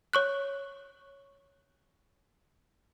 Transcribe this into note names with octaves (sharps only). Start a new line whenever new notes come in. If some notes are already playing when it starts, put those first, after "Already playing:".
C#5 C#6 F#6